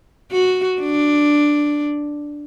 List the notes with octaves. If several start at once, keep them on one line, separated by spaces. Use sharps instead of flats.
F#4
D4